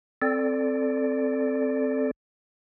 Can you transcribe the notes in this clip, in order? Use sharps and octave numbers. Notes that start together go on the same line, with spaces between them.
C4 A4 D5